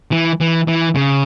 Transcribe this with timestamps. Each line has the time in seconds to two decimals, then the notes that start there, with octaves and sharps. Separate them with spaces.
0.12 E3
0.40 E3
0.68 E3
0.95 C#3